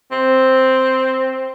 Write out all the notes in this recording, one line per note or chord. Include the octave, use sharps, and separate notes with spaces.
C4